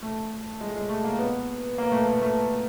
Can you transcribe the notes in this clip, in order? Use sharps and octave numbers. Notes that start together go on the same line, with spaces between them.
A3
G#3
G#3
A3
A#3
B3
A#3
A3
A#3
A3